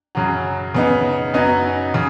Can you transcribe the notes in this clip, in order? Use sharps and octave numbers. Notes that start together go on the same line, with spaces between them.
F#2 C#3 F#3
C#3 B3 D#4
F#2 F#3 B3 D#4
C#3